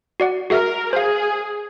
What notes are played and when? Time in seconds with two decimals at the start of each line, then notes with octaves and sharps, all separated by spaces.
0.20 F#4 D5 F#5
0.50 F#4 G#4 A#4 E5
0.93 G#4 C5 F5